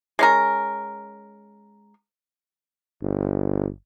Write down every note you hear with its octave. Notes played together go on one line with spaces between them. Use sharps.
G#3 C#4 A#4
G1